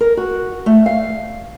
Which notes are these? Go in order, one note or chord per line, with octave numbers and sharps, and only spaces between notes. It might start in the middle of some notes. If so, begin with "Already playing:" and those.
A#4
F#4
A3
F5